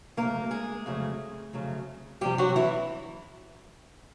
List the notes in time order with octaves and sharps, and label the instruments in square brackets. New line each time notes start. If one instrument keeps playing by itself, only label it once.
[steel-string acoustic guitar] F2 C#3 F#3 A3 A#3 A#4
G#3 G#4
F2 C#3 F#3 A3
F2 C#3 F#3 A3
F2 C3 F3 G3 G4
F#3 F#4
E3 E4